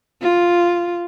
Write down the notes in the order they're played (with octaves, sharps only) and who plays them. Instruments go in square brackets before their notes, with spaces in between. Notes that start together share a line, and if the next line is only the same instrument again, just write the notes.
[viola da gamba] F4